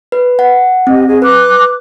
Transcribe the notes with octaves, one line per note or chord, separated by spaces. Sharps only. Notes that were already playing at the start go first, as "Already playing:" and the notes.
B4
F#5
C4 G4 D#5
G#4 D#5
B4 D6 F#6